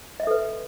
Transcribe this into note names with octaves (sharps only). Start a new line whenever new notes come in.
A4 B4 D#5 E5